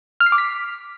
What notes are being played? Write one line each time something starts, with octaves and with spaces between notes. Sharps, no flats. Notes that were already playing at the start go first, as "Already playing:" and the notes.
F6
C7
D6
B6